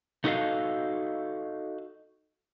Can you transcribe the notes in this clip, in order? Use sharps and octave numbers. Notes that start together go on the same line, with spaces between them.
A3 D#4 F#4 A4 D#5 F5